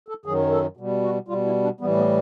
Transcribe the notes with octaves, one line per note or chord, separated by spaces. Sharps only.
A4
F#2 D#3 F#3 G#4
A4
B2 G3
F#4
B2 G3 F4
E4
D4
A2 E3 G3 B3
B3